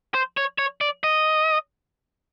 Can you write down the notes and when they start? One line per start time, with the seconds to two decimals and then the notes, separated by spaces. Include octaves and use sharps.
0.14 C5
0.37 C#5
0.58 C#5
0.81 D5
1.04 D#5